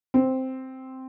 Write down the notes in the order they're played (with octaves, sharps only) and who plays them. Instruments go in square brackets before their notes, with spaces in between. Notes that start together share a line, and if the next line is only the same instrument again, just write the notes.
[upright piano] C4